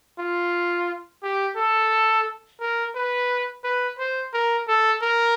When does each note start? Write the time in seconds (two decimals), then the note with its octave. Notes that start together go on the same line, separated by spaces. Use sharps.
0.19 F4
1.23 G4
1.57 A4
2.60 A#4
2.95 B4
3.64 B4
3.99 C5
4.33 A#4
4.68 A4
5.02 A#4